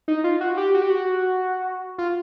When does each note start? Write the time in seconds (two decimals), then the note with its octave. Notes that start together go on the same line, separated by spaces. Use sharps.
0.08 D#4
0.24 F4
0.41 F#4
0.57 G4
0.74 F#4
0.82 G4
0.90 F#4
1.98 F4